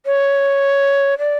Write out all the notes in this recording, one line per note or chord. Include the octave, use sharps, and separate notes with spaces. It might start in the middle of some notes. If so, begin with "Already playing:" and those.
C#5
D5